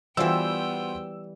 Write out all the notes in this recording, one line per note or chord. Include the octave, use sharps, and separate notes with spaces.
E3 G3 B3 F4 F#4 C5 G5 E6